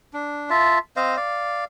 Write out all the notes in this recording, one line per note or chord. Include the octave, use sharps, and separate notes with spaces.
D4
F4 E5 A5
C4 C5 D#5 F5
D5 F5